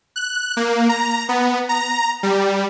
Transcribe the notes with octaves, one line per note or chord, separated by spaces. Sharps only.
F#6
A#3
A#5
B3
A#5
G3